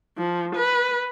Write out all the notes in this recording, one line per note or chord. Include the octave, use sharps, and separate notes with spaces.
F3
B4